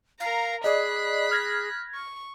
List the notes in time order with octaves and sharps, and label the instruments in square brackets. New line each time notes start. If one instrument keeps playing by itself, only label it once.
[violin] A#4 A#5 [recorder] F5
[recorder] G#4 [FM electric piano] D5 D#5 [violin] B5 F#6
[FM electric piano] F6 G#6 A#6
[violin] C#6